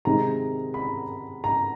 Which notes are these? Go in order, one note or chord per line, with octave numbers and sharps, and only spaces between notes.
C3 D#3 G#3 C4 D#4 A#5
B5
A#5